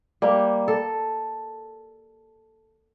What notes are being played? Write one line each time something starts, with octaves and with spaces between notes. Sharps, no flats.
G3 A#3
A4